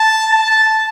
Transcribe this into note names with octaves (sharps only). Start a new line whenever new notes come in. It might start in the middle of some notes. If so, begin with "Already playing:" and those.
Already playing: A5
A5